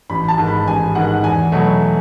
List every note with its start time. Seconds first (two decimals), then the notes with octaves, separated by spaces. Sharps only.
0.10 A1 B5
0.28 A5
0.38 G#2 D#3
0.47 B5
0.67 A1 G#5
0.95 G#2 D#3 F#5
1.24 E2 G#5
1.52 B2 F#3 A3